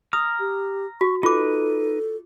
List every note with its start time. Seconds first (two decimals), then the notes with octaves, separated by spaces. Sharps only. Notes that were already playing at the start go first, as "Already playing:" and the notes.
0.13 A#5 D#6 F6
0.40 G4
1.01 F#4 C#6
1.23 D#4 F4 A4 B4 D6